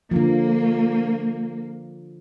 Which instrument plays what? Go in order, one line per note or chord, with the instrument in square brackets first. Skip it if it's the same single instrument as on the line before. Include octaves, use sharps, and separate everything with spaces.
[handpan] D3 F3 [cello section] A#3